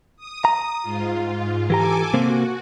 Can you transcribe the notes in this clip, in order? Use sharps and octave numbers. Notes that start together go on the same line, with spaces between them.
D#6
A#5
G#2 F4
E3 G4 A4 G#5 A#5 D6
C3 A#3 C4 F#4